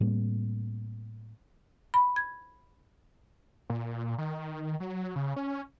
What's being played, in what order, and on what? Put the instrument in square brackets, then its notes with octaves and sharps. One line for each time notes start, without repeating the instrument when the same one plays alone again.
[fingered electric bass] A2 G3 A#3 C4
[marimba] B5
G#6
[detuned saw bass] A#2
D#3
F#3
C#3
C#4